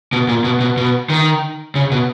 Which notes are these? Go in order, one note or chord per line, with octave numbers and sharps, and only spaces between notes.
B2
A#2
B2
B2
B2
D#3
C#3
B2